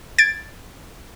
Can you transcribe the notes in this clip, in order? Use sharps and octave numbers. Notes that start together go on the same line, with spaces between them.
G#6 A6 D7